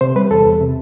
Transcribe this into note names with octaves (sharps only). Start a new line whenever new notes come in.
C3 C5
G3 B4
E2 A4
E2
C3